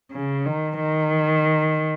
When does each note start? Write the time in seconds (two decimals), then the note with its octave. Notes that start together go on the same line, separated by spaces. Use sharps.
0.12 C#3
0.46 D#3
0.80 D#3